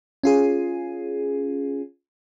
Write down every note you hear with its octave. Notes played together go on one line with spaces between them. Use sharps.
C#4 F4 G#4